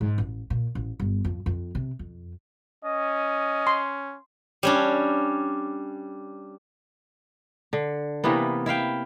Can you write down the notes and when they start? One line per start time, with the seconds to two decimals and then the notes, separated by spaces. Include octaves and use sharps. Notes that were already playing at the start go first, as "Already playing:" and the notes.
0.01 G#2
0.18 A1
0.50 A#2
0.75 A1
1.00 G1
1.24 F2
1.46 F2
1.75 C3
1.99 F2
2.84 C#4 D#5
3.67 C6
4.63 G3 C#4 D4
7.73 D3
8.24 C3 E3 A#3 B3
8.66 E4 E5 F5 G5